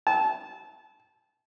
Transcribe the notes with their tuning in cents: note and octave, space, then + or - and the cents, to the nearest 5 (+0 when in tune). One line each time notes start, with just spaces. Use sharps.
A5 -25